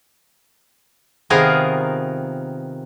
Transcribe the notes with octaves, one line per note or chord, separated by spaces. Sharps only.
C3 D#3 B3 F4 G#4 A#4